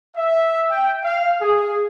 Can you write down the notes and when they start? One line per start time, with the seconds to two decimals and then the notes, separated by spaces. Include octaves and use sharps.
0.16 E5
0.70 G5
1.04 F5
1.41 G#4